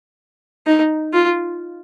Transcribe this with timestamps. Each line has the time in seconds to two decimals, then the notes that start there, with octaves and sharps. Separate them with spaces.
0.67 D#4
1.13 F4